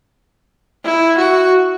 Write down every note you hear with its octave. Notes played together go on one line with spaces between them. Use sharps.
E4
F#4